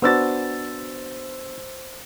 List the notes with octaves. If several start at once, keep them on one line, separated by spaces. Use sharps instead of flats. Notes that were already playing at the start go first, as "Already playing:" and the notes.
B3 D4 F#4 C5 E6 A6